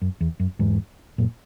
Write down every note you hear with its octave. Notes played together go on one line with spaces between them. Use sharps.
F#2
E2
F#2
E2 G#2
F#2 A#2